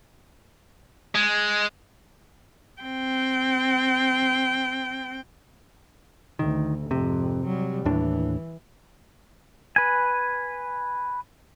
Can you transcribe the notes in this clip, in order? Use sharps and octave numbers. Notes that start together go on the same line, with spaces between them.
G#3
C4 G5
D2 D#3
G#1 F2 C3
F#3 G3
D#2 A2 E3 D4
B4 G#5